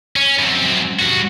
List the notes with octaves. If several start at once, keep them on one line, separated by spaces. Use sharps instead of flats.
C#4
F#2 C4
G2 F#4